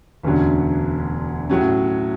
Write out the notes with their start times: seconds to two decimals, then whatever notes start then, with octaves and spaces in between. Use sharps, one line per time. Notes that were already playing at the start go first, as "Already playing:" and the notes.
0.23 E1 D2 D3 F#3 C#4
1.50 A2 F#3 C#4